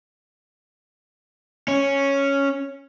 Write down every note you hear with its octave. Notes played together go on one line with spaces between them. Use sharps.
C#4